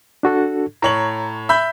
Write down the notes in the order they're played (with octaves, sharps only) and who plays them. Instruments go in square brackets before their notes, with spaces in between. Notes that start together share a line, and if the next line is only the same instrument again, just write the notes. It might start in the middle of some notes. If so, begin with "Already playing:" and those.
[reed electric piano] D4 F#4 A4
[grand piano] A2 C#5 F#7 [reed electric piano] A#5
[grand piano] E5 B5 G6